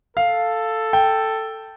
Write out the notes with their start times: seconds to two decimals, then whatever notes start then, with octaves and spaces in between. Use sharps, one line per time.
0.17 A4 F5
0.93 G5